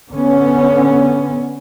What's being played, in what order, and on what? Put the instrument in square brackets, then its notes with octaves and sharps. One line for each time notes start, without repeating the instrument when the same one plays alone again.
[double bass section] D3 B3 C#4